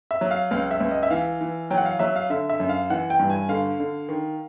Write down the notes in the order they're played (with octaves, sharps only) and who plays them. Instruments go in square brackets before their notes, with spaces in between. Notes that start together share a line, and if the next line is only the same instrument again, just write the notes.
[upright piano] E5
F#3
F5
C#2 F5
E5
C#2
D#5
E5
E3 F5
E3
F#3 G5
F#5
F5
F#3 E5
F5
D3 E5
E5
F#2
F5
E3 F#5
G5
G2
G#5
D3 F5
D3
D#3